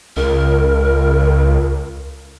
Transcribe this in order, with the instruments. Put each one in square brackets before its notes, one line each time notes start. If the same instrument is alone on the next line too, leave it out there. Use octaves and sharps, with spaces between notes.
[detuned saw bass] C#2 [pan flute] A#4